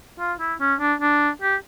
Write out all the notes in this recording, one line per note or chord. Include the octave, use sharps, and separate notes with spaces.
F4
E4
C#4
D4
D4
G4